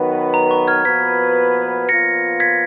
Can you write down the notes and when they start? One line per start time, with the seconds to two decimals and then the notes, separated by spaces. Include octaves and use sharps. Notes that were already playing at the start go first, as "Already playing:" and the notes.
Already playing: D#3 F#3 B3 F#4 B4
0.34 A#5
0.51 C#6
0.68 F6 G#6
0.85 A#2 F3 B3 F#4 B4 G#6 B6
1.88 A#2 F3 B3 F4 A#6 C#7
2.40 G#6 B6